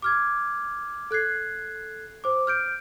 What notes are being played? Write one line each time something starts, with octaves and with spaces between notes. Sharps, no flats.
D6 F6 G#6
A4 F#6 G#6 C7
C5 D6
F6 G6 D7